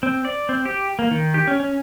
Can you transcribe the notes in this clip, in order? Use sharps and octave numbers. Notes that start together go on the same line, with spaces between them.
C4
D5
C4
G4
A#3
D#3
G4
C#4
C#4